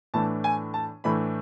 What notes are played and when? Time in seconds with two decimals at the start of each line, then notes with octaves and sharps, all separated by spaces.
0.14 A2 E3 A3 D4 A5
0.44 G#5
0.74 A5
1.04 A2 E3 A3 D4 B5